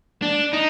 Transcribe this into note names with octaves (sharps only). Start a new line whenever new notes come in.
D4
D#4